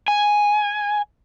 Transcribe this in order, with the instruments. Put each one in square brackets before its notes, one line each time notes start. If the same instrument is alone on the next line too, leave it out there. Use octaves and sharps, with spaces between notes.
[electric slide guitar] G#5